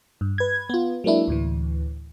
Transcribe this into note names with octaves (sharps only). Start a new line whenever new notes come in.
G2
B4 G#6
B3 F4
F#3 G#3 A#3 D4 E4
D2 A2 E3